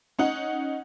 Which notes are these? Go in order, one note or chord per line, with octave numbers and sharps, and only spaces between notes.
C#4 D#4 F#5